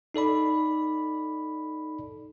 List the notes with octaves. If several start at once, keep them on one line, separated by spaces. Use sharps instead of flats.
D#4 A4 D5 B5